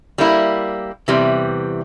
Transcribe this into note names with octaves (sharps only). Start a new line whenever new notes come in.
G3 A#3 E4
E2 C3 E3 G3